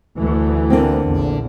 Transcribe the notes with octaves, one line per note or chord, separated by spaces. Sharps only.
D2 E3 A3
D3 A#3 C4
A#1 E2